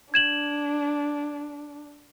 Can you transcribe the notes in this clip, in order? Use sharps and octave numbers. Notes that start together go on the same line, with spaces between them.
D4 G#6 E7 F#7